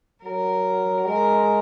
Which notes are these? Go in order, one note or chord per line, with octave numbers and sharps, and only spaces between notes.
F#3 A#4
G#3 A#4